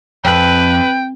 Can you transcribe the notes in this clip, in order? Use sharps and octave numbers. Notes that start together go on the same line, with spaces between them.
F2 B4 G5